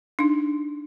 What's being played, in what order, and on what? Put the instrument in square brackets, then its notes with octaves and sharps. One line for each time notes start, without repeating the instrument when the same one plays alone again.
[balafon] D4 D#4